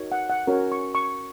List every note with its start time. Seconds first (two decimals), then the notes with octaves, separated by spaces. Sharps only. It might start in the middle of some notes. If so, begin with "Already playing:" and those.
Already playing: D#4 F#4 A#4 C#5
0.12 F#5
0.30 F#5
0.47 C#4 F#4 A#4 C#5
0.72 C#6
0.95 C#6